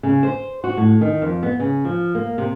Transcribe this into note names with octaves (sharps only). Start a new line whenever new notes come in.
C#3
C5
F#4
A2
D#3
F2
B3
C#3
F3
A#3
C3